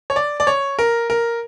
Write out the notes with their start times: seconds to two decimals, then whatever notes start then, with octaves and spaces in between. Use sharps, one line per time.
0.10 C#5
0.16 D5
0.40 D5
0.47 C#5
0.79 A#4
1.10 A#4